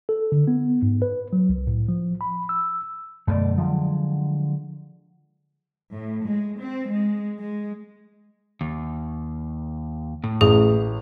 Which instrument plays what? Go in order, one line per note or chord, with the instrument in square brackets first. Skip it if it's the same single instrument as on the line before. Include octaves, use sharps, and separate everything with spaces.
[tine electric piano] A4
D3
B3
G#2
B4
F#3
C2
A2
F3
B5
E6
[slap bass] F#2 B2 D3 [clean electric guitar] A3 D5
[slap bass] D3 F#3 G#3 [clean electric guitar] F3
[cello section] A2
G#3
C4
G#3
G#3
[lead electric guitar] D#2
A2
[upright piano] A1 [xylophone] G#4